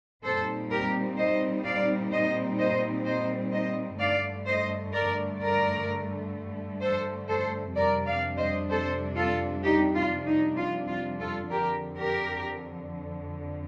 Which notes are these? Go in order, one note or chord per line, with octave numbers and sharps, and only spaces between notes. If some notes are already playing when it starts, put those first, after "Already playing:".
A#2 G3 C4 D#4 A4 C5
G4 A#4
C5 D#5
D5 F5
C5 D#5
C5 D#5
C5 D#5
C5 D#5
G2 D3 A3 D5 F5
C5 D#5
A#4 D5
A#4 D5
A4 C5
A4 C5
F2 C3 G3 D4 A#4 D5
D5 F5
C5 D#5
A4 C5
F4 A4
D#4 G4
F4
D#4
F4
F4
F4 A4
F2 D3 F3 G4 A#4
G4 A#4